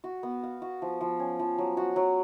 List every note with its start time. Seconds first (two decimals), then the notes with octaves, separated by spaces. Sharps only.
0.04 F#4
0.23 B3
0.43 F5
0.62 F#4
0.82 F3
1.01 F3
1.19 C#4
1.39 F3
1.58 F#3
1.77 F#4
1.96 F#3